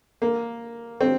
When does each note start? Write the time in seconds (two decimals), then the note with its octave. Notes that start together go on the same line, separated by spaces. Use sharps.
0.22 A#3
1.01 C4